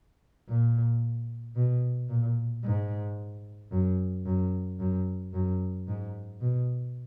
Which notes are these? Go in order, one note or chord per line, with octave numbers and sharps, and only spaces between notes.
A#2
B2
A#2
G#2
F#2
F#2
F#2
F#2
G#2
B2